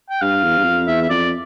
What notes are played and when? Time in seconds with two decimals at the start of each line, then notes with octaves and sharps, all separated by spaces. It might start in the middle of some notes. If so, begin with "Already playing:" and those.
0.10 G5
0.21 G2 F5
0.44 E2
0.58 G2
0.65 F2
0.87 E2 E5
1.02 E5
1.10 F2 D5